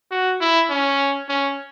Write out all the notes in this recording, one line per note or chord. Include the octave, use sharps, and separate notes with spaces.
F#4
E4
C#4
C#4